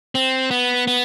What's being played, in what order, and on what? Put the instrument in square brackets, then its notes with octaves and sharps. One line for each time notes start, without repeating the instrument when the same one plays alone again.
[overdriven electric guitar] C4
B3
B3